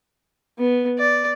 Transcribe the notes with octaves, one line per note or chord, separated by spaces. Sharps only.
B3
D5